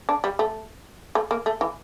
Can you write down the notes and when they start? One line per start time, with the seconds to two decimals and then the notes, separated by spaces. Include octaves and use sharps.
0.09 D4
0.24 G3
0.39 A3
1.15 A3
1.31 A#3
1.46 A3
1.61 E3